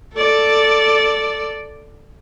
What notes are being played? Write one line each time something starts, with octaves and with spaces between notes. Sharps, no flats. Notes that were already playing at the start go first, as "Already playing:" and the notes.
A4 D5